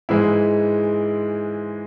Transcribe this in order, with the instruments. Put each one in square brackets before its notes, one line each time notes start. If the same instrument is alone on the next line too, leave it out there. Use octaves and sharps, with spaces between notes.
[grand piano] G#2 E3 G#3 E4